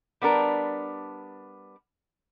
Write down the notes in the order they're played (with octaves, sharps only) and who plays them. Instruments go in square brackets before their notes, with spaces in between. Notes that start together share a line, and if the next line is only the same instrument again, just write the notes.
[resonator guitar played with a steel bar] G3 B3 D4 A#4